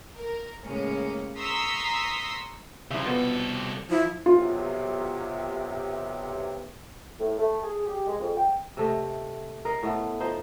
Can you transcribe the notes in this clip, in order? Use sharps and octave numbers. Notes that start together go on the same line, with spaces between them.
A#4
A2 C#3 G#3 A#3 C#4
A#5 C6 C#6 D#6 E6 B6
C2 C#3 F3 E5
C2 B2 F3 B3 A4
F3 E4
B1 C3 F4
A2
A3
G#4
G4
G#3
F2
G5
C3 A3 D#5
A#4 D#5 F5
A2 A3 B3
F3 D#4 C5